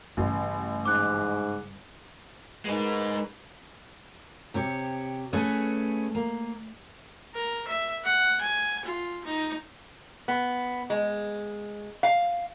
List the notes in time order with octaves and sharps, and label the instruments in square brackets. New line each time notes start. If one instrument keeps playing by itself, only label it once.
[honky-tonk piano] A1 [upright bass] G2 C#3
[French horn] G#2 [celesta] D6 F#6
[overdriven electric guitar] G#3 D#4 [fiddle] A#4 B4
[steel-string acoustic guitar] C3 G4 C#5
A3 C#4 G#4 B4
A#3
[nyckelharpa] A#4
E5
F#5
G#5
F4
D#4
[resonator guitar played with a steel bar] B3
G#3
F5